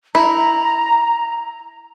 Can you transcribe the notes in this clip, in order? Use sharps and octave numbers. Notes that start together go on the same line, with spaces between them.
E4 A#5